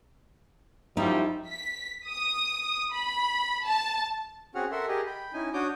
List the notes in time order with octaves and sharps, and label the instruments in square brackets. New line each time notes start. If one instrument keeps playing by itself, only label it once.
[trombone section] F#2 F3 G3 [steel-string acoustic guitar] D#4 E4 E5
[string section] B6
D#6
B5
A5
[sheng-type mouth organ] C4 C#4 F#4 G#4 F#5 F6
A4 A#4 E5 F#5 C6
G4 G#4 A#4 D#5
G5 B5
C#4 D#4 E4 G#5
D4 F#4 C#5 D6 D#6 G6